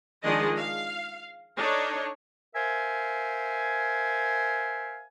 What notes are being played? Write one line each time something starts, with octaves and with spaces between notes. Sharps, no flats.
D#3 F3 G#3 D4 G#4 D#5
F5
D4 D#4 A4 C#5
A#4 C5 E5 F5 G#5